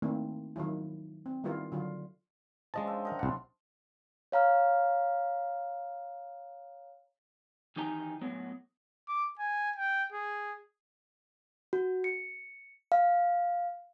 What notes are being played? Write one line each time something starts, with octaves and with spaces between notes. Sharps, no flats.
D#3 A3 A#3 C4 D4 E4
D#3 F3 F#3 E4
C4
D#3 G3 B3 E4 F4 A#4
D3 F#3 F4
F3 G#3 C#4 D4 D#5 A5
E5 G5
D#4 A#4 F#5
C2 D4 F#5 C6
C#5 F5 A#5 F6
D#3 E3 D#4 G4 G#5 A#5
A2 F#3 G#3 B3
D6
G#5
G5
G#4
F#4
C#7
F5